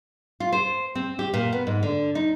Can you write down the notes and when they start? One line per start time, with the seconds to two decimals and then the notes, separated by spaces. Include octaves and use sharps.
0.40 F4
0.52 C5
0.95 C4
1.19 G4
1.34 A#2
1.53 B3
1.67 G#2
1.83 D3
2.15 D#4